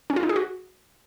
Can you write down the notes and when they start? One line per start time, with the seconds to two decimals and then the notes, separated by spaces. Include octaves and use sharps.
0.10 C#4
0.16 F4
0.23 D#4
0.29 G#4
0.36 F#4